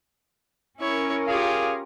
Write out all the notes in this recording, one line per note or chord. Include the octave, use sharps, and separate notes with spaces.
C#4 E4 A#4 C#5
F4 G4 G#4 C#5 F5